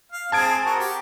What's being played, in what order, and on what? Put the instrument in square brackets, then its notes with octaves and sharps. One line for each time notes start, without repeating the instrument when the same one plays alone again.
[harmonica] F5
[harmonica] C4 G#4 [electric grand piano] A5 G#6 D7
[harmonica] F#4 A#4
G4